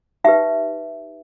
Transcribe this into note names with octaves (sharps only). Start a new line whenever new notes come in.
D#4 G4 B4 E5